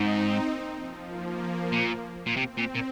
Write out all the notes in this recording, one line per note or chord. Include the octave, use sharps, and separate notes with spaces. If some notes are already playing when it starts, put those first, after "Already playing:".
Already playing: G#2 C4 D#4
A#3
F3
A#3
A#2
A#2
C3 C4
A#2
A#2